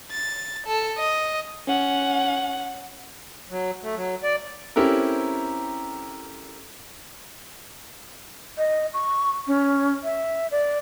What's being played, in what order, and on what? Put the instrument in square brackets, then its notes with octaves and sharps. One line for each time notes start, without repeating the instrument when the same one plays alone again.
[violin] A6
A4
D#5
[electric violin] C#4 F#5
[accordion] F#3
A3
F#3
D5
[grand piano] C4 C#4 E4 G4 A4 A#4
[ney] D#5
C#6
C#4
E5
D5